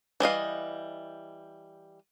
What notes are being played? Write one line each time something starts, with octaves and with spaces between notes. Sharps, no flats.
E3 G3 D#5 F5